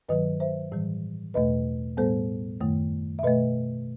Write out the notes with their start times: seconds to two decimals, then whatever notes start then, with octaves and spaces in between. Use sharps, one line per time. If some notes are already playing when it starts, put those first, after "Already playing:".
0.09 G2 D#3 F#3 B4 D#5
0.40 C5 E5
0.72 A2 E3 G3
1.34 E2 B2 A3 B4 D#5
1.97 A2 G3 B3 A4 C5
2.61 F#2 D#3 A3
3.19 E5
3.23 B2 A3 B4 D#5